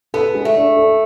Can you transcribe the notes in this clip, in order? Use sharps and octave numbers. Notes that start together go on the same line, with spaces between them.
B3 A4
G#3
A3
D4
A4